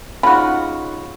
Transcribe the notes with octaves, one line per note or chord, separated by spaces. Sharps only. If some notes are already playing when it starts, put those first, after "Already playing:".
C#3 D#4 F4 F#4 B5